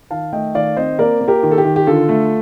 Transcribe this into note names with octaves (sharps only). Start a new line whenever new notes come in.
D#3 F5 A5
A3 D#5 G5
D#3 D5 F5
C4 C5 D#5
A#3 A#4 D5
A#3
G4 A#4
D#3
A4
G4
D#3
G4
D3 F4 A4
A3